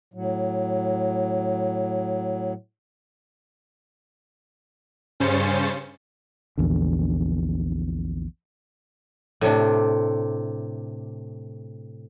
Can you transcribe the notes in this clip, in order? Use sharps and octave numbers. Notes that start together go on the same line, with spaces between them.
A2 F#3
G2 C#3 C#4 C5 A6 C#7
A#1 E2 D3
A2 C3 D4